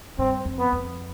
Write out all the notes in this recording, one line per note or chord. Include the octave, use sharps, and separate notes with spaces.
G2 C4
F2
B3
F2